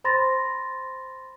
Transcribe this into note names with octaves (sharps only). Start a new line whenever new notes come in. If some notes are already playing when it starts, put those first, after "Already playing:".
C5 B5 C6 A6 A#6